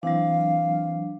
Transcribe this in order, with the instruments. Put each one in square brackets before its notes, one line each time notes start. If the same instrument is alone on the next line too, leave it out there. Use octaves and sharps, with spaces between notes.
[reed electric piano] E3 C4 [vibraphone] F#3 D4 [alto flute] F5